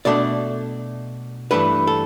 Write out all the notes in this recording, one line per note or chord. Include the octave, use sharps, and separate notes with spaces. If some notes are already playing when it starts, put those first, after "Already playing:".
B2 A3 D4 D5
G2 E3 A3 D4 B4
A4